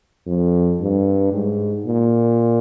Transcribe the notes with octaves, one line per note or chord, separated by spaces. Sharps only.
F2
G2
G#2
A#2